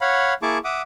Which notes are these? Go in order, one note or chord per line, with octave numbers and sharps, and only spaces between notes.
C#5 F5 F#5 B5
A#3 E4 G#4 A5 C#6 D6
E5 F#5 D6 D#6